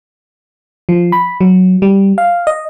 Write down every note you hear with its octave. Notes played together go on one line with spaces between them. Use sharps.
F3
B5
F#3
G3
F5
D#5